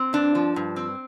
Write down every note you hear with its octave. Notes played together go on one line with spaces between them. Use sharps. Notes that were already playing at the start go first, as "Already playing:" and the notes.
Already playing: C4
G2 D4
F3
G2
C4